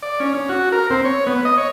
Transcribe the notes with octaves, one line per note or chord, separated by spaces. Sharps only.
D5
C#4
C#4
F#4
A#4
C4
C#5
B3
D#5
C#5